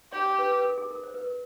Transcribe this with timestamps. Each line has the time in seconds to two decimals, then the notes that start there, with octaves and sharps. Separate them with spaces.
0.12 G4 C#5
0.26 C#5
0.39 B4
0.52 B4
0.65 A#4
0.78 G#4
0.91 A#4
1.03 C5
1.14 B4
1.25 A#4